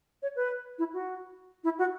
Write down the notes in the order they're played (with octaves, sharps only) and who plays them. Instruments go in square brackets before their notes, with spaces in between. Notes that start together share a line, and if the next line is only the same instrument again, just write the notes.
[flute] C#5
B4
E4
F#4
E4
F#4